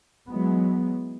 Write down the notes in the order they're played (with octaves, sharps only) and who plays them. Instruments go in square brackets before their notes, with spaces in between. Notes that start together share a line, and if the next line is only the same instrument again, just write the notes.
[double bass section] E3 F#3 G#3 B3